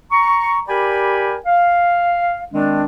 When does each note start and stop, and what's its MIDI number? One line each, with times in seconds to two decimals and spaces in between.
0.11 0.60 82
0.11 0.60 85
0.68 1.35 67
0.68 1.35 70
0.68 1.35 74
0.68 1.35 79
0.68 1.35 80
0.68 1.35 83
1.46 2.44 77
2.52 2.85 51
2.52 2.85 56
2.52 2.85 60
2.52 2.85 62